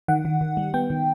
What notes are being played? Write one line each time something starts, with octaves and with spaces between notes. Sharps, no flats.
D#3 F#5
D#3
D#3
G3
B3 G5
D#3